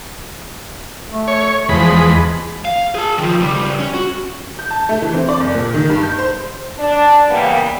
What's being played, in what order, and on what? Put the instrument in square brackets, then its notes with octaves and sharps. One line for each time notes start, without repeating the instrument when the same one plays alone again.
[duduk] A3
[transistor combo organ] C#5
[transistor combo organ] E2 G#3 B5 [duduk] F3
[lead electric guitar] F5
G#4 A5
D#3 F3
C#2 G3
C#4
F#4
[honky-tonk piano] G6
A5
A3
E3
C4
D5
F#1
A#2
D#3
G2
G6
C5
[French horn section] D4
C#3 E3 G3 A#3 B3